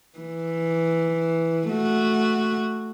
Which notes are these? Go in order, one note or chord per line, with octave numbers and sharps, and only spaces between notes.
E3
A3 F#4